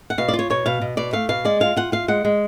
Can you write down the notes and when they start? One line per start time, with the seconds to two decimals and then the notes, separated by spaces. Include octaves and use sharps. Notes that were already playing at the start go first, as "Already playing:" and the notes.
0.10 F#5
0.18 B2 F5
0.28 D5
0.33 F4
0.39 C#5
0.50 B2 C#5
0.66 B2 F5
0.81 B2
0.97 B2 D5
1.13 A3 F5
1.29 B2 F5
1.45 G#3 D5
1.60 F4 F5
1.76 F4 F#5
1.92 F4 F5
2.08 G#3 F#5
2.25 G#3